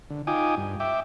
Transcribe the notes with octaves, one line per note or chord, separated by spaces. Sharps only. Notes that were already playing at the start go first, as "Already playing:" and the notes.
D3
D#4 F4 G5 G#5 D6 D#6
G2
E5 G5 D6